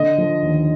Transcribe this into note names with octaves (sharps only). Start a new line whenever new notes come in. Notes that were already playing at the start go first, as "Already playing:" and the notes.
Already playing: D3 D#5
F3
D#2